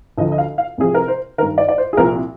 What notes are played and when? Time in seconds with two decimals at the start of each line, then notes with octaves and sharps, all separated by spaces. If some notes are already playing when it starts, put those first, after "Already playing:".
0.18 D2 D3 F3 D#5
0.32 D#5
0.38 F5
0.58 F5
0.78 C2 C3 F3 G#4
0.94 A#4
1.08 C5
1.38 D#3 A#4
1.42 G2
1.58 D5
1.68 D5
1.78 C5
1.93 G#4
1.97 C2 A#2 F3 A#4